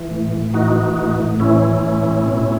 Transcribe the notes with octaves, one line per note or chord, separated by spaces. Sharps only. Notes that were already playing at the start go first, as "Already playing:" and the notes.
Already playing: E3
A2
A2
E3 D#4 F#4
E3
A2
A2
E3 C#4 E4
E3
A2
A2
B2